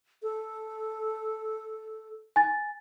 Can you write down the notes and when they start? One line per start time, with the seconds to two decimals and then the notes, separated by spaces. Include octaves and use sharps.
0.23 A4
2.36 G#5 A6